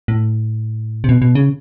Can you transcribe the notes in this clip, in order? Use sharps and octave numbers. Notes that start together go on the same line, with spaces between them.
A2
C3
B2
B2
C#3